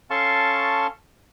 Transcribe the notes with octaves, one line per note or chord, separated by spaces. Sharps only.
C#4 A4 F5 A5 C6 C#6